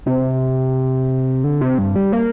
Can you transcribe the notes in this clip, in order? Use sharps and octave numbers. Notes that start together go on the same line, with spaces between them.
C3
D3
C3
G2
G3
A#3